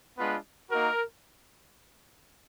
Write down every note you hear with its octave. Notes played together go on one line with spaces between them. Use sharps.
G#3 B3 D4 F4 B4
A#3 D#4 F#4 A#4